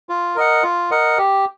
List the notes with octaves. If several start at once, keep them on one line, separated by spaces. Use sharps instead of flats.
F4
A#4 D#5 F#5
F4
A#4 D#5 F#5
G4